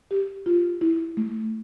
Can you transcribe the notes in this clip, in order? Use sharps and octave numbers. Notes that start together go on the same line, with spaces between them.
G4
F4
E4
A3